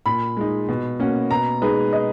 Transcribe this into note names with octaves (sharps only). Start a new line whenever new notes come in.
A#2 B5
G#3 D#4
B2
A#3 C#4 F#4
B2 A#5
G#3 D#4 G#4 B4
D#5